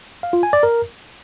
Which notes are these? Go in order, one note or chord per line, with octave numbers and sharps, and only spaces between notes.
F5
F4
G#5
D5
A#4